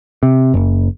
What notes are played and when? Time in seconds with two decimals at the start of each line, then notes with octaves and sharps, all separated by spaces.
0.23 C3
0.54 F#1